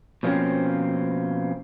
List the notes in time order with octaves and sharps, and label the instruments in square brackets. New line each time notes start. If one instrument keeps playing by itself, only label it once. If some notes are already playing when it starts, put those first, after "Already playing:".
[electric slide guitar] B2 F3 A#3 C4 C#4